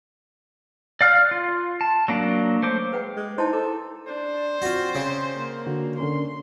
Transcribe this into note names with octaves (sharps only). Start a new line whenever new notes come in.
D5 F5 F6 F#6
F4
A5
F#3 A#3 D4
A3 C5 D6
G#3 B4 F#5 G5
G#3
D#4 E4 C5 D#5 A5
A4 D6
D4 C5
C4 F4 F#4
C#3
A#3
D3 F#4
D3 C#4 A#4 C6